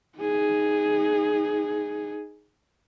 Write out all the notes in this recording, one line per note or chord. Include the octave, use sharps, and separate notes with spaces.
D#4 G#4